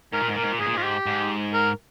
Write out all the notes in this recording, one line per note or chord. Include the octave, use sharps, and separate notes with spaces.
G#2 A#4
A#2
G#2
A#2 A#4
G#2
A#2
G#2 G#4
A#2
G#2 F4
G4
G#2
A#4